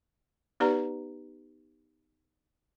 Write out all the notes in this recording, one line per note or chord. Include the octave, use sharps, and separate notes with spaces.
B3 D#4 G4 B4 D5 A#5